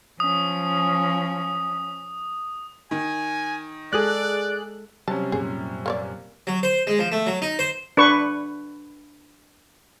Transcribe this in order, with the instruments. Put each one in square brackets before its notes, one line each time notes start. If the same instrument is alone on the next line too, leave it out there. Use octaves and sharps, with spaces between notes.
[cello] F3 C#4 [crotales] D#6
[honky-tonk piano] D#3 [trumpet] G#5
[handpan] G#3 A4 [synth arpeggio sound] G#4 F#6 [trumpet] D5
[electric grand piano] C3 G3 C#4 [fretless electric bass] F#3 [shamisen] A5
[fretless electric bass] F#2 A#2 [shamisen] G#4
[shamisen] A#3 C#5 D5
[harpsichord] F#3
C5
G#3
F3
A3
F#3
D#4
C5
[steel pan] D4 B4 C#6